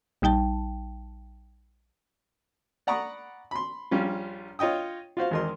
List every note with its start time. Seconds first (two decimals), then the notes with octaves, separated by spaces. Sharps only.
0.22 A#1 G3 D#4 G5 A5
2.87 D5 F#5 A#5 B5 C#6 D#6
3.51 B5 C6
3.91 A#1 G3 C#4 F4
4.59 F4 C#5 D#5 G5 D#6
5.17 F4 F#4 C5 F5
5.31 G#1 E2 A#4 D#5 C6